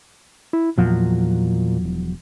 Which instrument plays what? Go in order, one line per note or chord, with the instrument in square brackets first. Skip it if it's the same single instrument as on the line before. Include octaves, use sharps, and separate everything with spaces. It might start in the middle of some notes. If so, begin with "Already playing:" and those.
[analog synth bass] E4
[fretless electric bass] E2 F3 F#3 [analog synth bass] A#2
[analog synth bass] E1